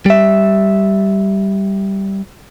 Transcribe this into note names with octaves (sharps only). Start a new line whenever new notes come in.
G3 E5